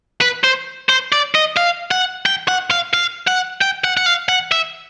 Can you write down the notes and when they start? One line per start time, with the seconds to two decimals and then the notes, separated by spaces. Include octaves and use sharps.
0.21 B4
0.44 C5
0.89 C5
1.12 D5
1.35 D#5
1.57 F5
1.91 F#5
2.26 G5
2.48 F#5
2.71 F5
2.93 F5
3.27 F#5
3.61 G5
3.84 F#5
3.97 F#5
4.06 F5
4.29 F#5
4.52 E5